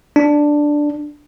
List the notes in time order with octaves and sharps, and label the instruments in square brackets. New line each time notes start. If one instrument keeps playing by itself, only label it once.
[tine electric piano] D4